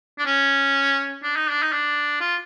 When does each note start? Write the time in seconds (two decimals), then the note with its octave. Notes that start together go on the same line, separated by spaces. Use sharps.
0.19 D4
0.26 C#4
1.23 D4
1.36 D#4
1.50 D4
1.62 D#4
1.73 D4
2.21 F4